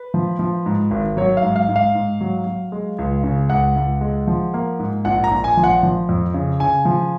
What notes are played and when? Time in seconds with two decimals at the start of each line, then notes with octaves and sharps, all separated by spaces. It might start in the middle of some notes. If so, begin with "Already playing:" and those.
Already playing: B4
0.14 F3
0.39 F3
0.66 G#2
0.91 G#1
1.17 F#3 C#5
1.37 F5
1.43 G#2
1.56 F5
1.69 G#2
1.76 F5
1.95 G#2
2.21 F#3
2.47 F#3
2.72 G#3
2.99 C#2
3.24 C#3
3.50 C#2 F#5
3.76 C#2
4.01 G#3
4.27 F3
4.54 A#3
4.79 G#2
5.05 A#1 F#5
5.24 A#5
5.31 A#1
5.44 G#5
5.57 F3
5.64 F#5
5.83 F3
6.09 F2
6.34 C#3
6.60 C#3 G#5
6.85 F3